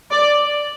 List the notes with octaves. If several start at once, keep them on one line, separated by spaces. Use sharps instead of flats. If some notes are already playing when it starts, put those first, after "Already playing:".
D5